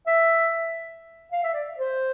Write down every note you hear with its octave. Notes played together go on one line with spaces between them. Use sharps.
E5
F5
E5
D5
C5